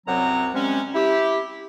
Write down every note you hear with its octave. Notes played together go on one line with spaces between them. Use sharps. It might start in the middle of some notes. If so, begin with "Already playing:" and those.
C2 F#2 F#3 C4 F#5 A#5
C3 G3 G#3 C4 C#4
E4 G4